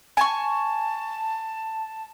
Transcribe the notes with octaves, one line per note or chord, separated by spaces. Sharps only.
G#5 A5 C#6